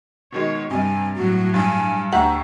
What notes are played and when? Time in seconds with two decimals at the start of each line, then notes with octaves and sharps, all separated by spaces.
0.32 B2 D#3 G#3 C#5
0.71 G2 C3 G3 G#5
1.16 A2 F#3 F#4
1.54 G2 G#5
2.13 D2 G4 E5 F#5 A#5 C#6